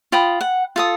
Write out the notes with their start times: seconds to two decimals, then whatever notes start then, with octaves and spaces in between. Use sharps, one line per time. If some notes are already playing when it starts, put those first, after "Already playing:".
0.12 F4 G5 B5 D#6
0.41 F#5
0.76 F4 A4 D#6